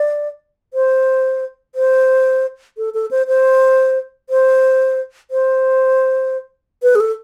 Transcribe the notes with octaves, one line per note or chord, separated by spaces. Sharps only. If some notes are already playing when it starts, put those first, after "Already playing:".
Already playing: D5
C5
C5
A4
A4
C5
C5
C5
C5
B4
G#4
A4